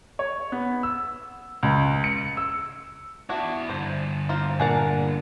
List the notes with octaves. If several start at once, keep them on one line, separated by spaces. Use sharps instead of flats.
C#5
B3
E6
C#2
C#7
E6
B3 D4 E4 F#4
G2 D3 C5
A#3 F4 C5
A#2 D4 G#4 A#4 F#5 A5